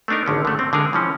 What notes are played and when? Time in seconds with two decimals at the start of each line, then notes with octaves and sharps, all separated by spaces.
0.08 A3 B3 D4 D#4 A#4
0.26 G#1 D3 C#4
0.45 D3 A3
0.59 C4
0.73 D3 G#3 G#4 A#4
0.93 E3 F3 C#4